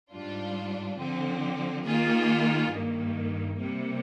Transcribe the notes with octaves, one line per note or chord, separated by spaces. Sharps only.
G#2 G3 D4 F4
D3 F3 C4
D#3 A#3 F4 G#4
G2 D#3 A#3
C3 G3 A#3